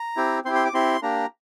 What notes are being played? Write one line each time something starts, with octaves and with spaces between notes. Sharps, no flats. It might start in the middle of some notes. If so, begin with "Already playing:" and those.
Already playing: A#5
C4 E4 G4
C4 E4 G4 C6
C6
D6
C4 E4 G4 C6
A#3 D4 G4 A#5